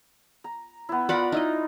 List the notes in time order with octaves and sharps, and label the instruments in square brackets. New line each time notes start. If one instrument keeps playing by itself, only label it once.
[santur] A#5
B3 E4
[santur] F4 A#4 [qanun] D5 F#5 B5
[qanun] D#4 E4 D#5